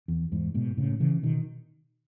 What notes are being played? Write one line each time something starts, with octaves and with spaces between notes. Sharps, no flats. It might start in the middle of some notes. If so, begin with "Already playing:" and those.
E2
E2 G#2
G#2 B2
A2 C#3
C#3 E3
B2 D#3